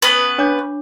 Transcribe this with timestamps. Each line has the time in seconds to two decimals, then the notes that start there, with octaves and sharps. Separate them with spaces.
0.02 B3 C#4 B4
0.38 D4 C#5 D6